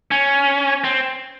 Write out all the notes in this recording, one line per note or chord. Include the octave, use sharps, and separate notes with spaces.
C#4
C4